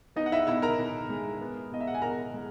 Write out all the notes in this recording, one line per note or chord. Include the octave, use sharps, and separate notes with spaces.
B3 D#4 D#5
F#5
E4 E5
B2 E4 E5
A#4 A#5
B2
G#3
B3
B2 D#5
E5
F#5
G#5
B2 A#4 A#5
G#3